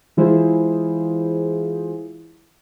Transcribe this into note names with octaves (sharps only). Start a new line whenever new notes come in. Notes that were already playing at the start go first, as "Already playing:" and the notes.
E3 G#3 E4 F4 G#4 C5